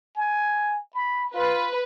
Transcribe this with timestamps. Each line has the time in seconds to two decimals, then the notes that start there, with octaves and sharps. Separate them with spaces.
0.17 G#5
0.94 B5
1.34 F4 B4